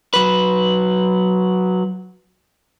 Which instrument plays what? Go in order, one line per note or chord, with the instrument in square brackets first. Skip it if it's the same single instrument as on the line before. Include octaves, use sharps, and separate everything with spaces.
[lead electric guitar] F#3 B4